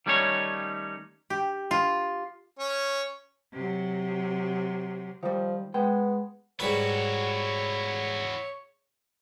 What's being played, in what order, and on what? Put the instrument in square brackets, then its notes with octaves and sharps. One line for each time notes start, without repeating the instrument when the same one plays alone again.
[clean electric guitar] D#3 G3 A3 C#4 D#4 C#5
[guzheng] G4
F4
[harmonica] C#4 C#5
[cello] C3 F#3
[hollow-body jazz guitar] D#3 G3 [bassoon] F3
[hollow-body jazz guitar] G#3 G5 [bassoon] B3
[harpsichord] G#2 G3 B4 [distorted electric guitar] E4 F#4 [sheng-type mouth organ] C#5